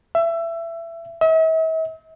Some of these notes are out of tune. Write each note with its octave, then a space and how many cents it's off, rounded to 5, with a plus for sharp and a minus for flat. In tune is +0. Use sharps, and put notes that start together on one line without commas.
E5 +20
E5 -45